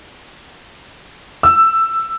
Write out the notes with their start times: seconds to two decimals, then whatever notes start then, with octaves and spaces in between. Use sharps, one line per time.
1.43 E6